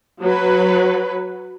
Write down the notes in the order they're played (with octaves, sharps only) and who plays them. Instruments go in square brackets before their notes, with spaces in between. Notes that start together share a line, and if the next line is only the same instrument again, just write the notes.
[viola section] F#3 B4